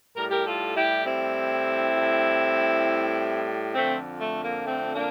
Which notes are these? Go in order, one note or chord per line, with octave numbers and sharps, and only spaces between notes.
A2 G3 A#4
G4 A#4
F4 A4
E4 G4
C4 E4
A2 G3
F2 D3 F3 A3 C4
A3
A#3
A3 C4
A#3 D4